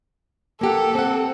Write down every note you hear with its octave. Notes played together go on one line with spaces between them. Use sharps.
A#3 G4 A4 F#5
C4 F#5